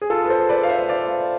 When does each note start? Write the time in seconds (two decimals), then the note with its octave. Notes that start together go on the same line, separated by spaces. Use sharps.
0.02 G#4
0.10 F4 A4
0.25 B4
0.29 A4 C5
0.49 B4 D5
0.63 F5
0.69 C5 E5
0.89 D5 F5